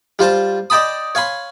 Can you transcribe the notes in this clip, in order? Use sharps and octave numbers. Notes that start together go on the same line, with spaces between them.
G3 F4 C5 A5
D5 D#5 G5 A5 B5 D#6
C#5 F5 G#5 B5 C6